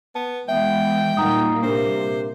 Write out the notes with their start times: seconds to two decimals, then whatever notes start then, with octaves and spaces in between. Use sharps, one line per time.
0.15 B3 A5
0.48 E3 G#3 B3 E5 G5
1.17 A#2 G3 A#3 D#4 F#5 A#5 D#6
1.63 C3 D4 A#4 C5